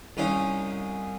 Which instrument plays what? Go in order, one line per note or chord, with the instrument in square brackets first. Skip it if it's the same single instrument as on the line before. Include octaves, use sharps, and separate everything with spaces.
[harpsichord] C2 C#4 D#4 F5